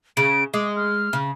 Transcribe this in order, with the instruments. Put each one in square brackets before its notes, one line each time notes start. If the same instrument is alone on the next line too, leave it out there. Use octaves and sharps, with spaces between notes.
[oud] C#3 [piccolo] D7
[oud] G#3 [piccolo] D6
[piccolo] F6
[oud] C#3